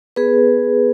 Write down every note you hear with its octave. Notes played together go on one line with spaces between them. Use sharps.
B3 G#4 B4